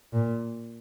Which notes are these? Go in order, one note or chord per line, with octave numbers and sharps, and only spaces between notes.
A#2